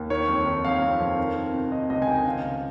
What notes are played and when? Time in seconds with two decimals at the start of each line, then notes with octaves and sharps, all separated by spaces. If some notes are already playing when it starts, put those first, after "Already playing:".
Already playing: D#2
0.10 D#3 C#5
0.28 F2
0.46 D#3
0.64 F2 F5
0.82 F2
1.00 F2
1.18 D#3
1.36 D#3
1.53 C3
1.72 D#3 D#5
1.90 C#2 D#5
2.02 G#5
2.08 D#3 G5
2.26 C#3 F5
2.44 C#2